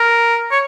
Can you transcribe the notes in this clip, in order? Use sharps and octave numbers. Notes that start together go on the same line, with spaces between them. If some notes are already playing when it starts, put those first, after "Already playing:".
Already playing: A#4
C#5